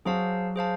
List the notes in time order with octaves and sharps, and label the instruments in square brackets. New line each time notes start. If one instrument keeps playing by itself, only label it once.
[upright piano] F#3 F#4 [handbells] G#4 C5 F5 A5
[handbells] G#4 C5 F5 A5